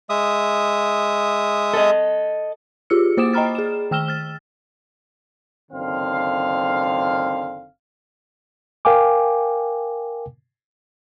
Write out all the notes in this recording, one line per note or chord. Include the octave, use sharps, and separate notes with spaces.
G#3 E5 D#6
A4 D#5
F4 G4 G#4 E6 C#7
A#3 C5 D6 D#6 D7 E7
D#5 G5 A#5 B5 F6 A6
G#4 E7
D#3 G5 E6 F6 E7 G7
F6 A6
F#1 D3 D#3 C4 F5
A#4 F5 G5 G#5 D6